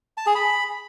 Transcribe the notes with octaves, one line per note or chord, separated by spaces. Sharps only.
A5
G#4
B5